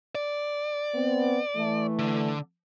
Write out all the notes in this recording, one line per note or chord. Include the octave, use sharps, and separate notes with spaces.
D5
B3 C4
E3 A3
D3